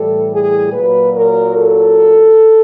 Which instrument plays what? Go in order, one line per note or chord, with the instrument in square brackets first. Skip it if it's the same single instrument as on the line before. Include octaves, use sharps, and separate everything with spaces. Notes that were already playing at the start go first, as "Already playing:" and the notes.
Already playing: [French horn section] A2 E3 G3 A4
G#4
A#2 F#3 B4
A#4
A4